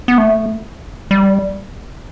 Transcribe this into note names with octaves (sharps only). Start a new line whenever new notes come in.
B3
A3
G3